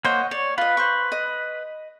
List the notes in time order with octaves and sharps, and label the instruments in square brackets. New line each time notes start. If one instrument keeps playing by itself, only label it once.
[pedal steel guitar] A#3 C5 [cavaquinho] C#5 D#5 F#5
[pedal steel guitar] C#5 [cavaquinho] D5
[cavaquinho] F4 D#5 [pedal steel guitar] B4
[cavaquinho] C5 C6 C#6
D#5